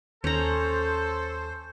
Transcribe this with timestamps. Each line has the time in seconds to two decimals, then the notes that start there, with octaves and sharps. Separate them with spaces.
0.24 D#2 C#4 A4 C5 A#5